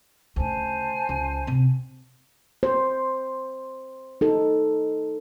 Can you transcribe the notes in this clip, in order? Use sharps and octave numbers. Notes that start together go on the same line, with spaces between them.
D2 C#3 C5 G#5 A5
C#2
C3
C5
D#4 A4